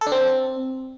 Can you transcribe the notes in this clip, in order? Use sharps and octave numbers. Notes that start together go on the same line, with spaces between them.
A4
D4
C4